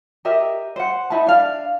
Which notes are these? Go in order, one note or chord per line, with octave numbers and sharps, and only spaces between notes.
G4 A#4 D#5 E5
C5 F#5
D#4 E4 A5
D4 F5